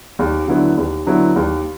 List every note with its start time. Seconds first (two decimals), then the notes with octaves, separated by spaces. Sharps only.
0.19 D#2
0.48 D3 F#3 B3 E4
0.77 D#2
1.07 D3 F#3 B3 E4
1.36 D#2